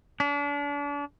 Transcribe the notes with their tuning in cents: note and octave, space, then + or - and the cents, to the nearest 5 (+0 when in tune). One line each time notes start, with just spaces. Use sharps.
D4 -35